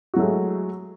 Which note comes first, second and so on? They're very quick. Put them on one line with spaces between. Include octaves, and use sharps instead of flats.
F#4 F#3 A3 G#3